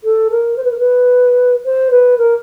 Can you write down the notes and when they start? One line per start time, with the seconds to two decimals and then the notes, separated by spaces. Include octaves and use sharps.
0.03 A4
0.30 A#4
0.56 C5
0.64 B4
0.71 A#4
0.78 B4
1.64 C5
1.90 B4
2.17 A#4